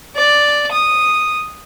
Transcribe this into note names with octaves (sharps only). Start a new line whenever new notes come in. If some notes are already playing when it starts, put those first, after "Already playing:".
D5
D#6